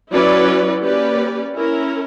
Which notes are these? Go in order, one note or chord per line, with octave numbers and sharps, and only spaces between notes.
F#3 C#4 E4 B4 D5
A#3 C#4 G4 B4 D5
C#4 E4 A#4